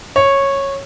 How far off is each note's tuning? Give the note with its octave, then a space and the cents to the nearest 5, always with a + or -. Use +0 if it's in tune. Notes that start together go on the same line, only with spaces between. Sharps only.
C#5 -10